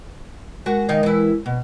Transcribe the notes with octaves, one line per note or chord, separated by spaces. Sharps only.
G#3 F#4 A#4
D#3 D#4 F5
E3 E4
B2